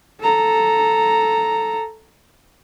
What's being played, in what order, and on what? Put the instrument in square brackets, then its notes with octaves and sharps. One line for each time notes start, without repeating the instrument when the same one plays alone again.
[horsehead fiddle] A4 A#5